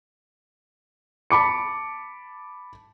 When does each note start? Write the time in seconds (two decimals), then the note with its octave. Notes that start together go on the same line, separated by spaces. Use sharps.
1.31 A5 B5 D6 C#7